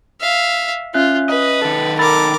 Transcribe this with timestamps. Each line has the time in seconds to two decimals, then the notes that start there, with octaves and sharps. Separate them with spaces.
0.21 E5 F5
0.94 C#4 F4 E5 F#6
1.29 B4 D#5
1.62 D#3 A4
1.99 A#4 B5 D6 E6 A6